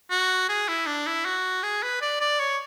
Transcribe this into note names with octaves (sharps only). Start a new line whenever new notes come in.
F#4
G#4
E4
D4
E4
F#4
G#4
B4
D5
D5
C#5